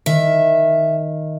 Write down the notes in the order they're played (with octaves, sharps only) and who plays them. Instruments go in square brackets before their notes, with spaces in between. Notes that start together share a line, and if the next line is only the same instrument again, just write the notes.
[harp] D#3 [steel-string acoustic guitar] E5